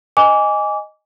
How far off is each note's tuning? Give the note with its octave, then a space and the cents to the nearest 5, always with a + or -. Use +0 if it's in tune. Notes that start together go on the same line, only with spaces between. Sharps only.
D#5 +0 G#5 -10 D6 -25